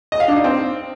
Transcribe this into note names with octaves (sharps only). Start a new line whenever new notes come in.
D#5
F5
D4
D#4
C4